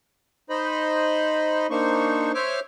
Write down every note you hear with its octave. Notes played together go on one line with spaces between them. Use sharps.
D#4 C5 D#5 B5
A#3 D4 D#4 C5 C#6
C5 C#5 E5 D6 F6